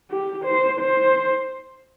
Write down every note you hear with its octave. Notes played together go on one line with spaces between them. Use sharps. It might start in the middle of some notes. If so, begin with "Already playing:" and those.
G4
C5
C5